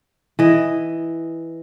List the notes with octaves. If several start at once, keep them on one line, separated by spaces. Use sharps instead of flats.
E3 D#5